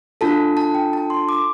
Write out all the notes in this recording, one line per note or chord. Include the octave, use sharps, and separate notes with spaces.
D4 F4 A4 A5
A5
G5
A5
C6
D6